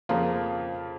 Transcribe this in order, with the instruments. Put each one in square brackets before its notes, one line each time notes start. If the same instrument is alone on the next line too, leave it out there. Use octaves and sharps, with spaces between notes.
[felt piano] F2 C#3 F3 A#3 F4